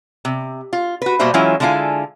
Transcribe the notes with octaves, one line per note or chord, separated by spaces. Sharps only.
C3
F4
F#4 B4
B2 G3 A#3 F#4 C5 E5
E3 F#3 G#3 C#4 E4 F4
D3 G#3 E4 F4 F5 G#5